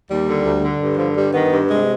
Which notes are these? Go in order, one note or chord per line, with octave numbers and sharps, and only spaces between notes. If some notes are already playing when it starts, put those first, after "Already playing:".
D#2 G3
D3
D2
D3
G2
D3 F3
G2 G3
D#3 B3
G2
C3 G#3